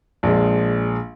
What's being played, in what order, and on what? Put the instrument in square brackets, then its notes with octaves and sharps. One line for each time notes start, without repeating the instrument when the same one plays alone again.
[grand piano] A#1 G#3